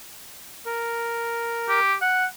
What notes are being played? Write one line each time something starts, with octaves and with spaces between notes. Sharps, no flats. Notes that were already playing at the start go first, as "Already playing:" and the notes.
A#4
G4
F#5